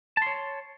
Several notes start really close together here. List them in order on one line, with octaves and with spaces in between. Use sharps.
A5 C6 C#5